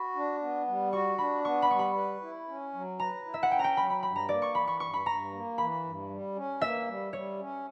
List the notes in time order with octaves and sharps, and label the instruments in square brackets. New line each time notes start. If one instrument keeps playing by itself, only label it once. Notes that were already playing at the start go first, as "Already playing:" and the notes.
Already playing: [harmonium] F#4 [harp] B5
[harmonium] D4
B3
G3
[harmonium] F#4 [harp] C#6
[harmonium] D4 [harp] B5
[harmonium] B3 [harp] C#6
[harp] B5
[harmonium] G3 [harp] C#6
[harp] B5
[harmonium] B4
E4
C#4
F#3
[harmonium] B4 [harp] A#5
[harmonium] E4
[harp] E5
F#5
[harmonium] C#4 [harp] G5
[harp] A#5
G5
[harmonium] F#3 [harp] B5
[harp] B5
[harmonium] G2 [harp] B5
[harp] A#5
[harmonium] A#3 [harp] D5
[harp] C#6
[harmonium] E3 [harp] B5
[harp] C#6
[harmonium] G2 [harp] C#6
[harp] B5
[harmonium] G2 [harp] A#5
[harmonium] A#3
[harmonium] E3 [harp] B5
[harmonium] G2
G3
C#4
[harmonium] A#3 [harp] E5
[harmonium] G3
[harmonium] G3 [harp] C#5
[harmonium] C#4